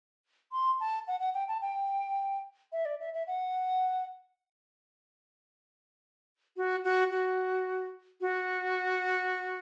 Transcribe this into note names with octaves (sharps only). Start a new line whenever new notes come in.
C6
A5
F#5
F#5
G5
A5
G5
E5
D5
E5
E5
F#5
F#4
F#4
F#4
F#4